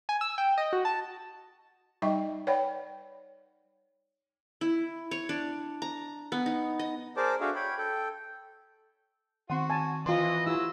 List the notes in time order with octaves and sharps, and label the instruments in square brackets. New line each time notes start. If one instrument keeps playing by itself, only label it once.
[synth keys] G#5
E6
G5
D#5
F#4
A5
[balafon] G3 D#4 D#5 E5 G5 C#6
B4 C#5 D5 F#5 G5 B5
[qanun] E4
C#5
D4
A#5
B3
D#4
D#5
[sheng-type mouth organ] G#4 A#4 C5 D5 A5 D6
D4 F#4 G#4 A4 E5 F5
C#5 G5 B5
A4 G5
[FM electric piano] D#3 C4 [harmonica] F#4 [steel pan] F#5 C6
[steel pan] G#5 A5
[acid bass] E3 [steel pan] F4 C6 [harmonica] D#5
[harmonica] F#3 E6 [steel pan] E4 F4 [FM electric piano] G4